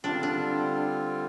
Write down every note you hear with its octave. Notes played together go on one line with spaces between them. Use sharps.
D3 G3 C4 D4 F4
D4